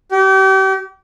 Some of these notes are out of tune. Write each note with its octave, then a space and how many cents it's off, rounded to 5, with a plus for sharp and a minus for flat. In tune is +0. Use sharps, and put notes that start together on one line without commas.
G4 -35